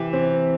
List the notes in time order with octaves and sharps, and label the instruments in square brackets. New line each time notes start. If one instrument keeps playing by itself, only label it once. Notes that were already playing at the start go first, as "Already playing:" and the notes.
Already playing: [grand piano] C3 G4 [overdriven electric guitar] E3
[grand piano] C4